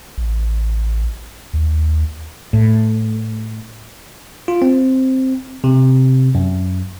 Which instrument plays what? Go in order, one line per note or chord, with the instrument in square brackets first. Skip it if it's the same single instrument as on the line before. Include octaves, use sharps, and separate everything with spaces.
[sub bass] A1
D#2
[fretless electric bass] A2
[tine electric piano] F4
C4
C3
F#2